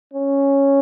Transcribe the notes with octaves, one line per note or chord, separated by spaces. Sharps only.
C#4